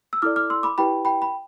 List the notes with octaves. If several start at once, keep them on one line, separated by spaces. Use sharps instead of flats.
E6
E4 A4 D5 D6 F6
D6 F6
C6 E6
B5 D6
E4 G4 B4 G5 B5
G5 B5
B5